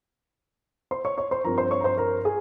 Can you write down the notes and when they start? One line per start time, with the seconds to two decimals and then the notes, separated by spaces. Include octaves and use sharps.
0.91 C5 C6
1.05 C#5 C#6
1.18 C#5 C#6
1.31 C5 C6
1.44 G2 F3 C4 A#4 A#5
1.58 C5 C6
1.71 C#5 C#6
1.80 A#5
1.84 C5 C6
1.97 A#4 A#5
2.25 G#4 G#5